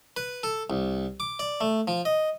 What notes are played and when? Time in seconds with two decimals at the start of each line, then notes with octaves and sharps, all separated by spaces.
0.17 B4
0.43 A4
0.70 C2
1.20 D6
1.39 D5
1.61 A3
1.88 F3
2.05 D#5